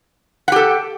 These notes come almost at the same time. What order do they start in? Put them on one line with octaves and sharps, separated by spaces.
F#5 G4 A4